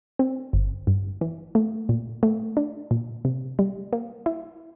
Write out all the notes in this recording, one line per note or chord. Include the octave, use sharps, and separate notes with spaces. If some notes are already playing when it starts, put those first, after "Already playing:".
C4
G1
G2
E3
A3
A#2
A3
D4
A#2
C3
G3
A#3
E4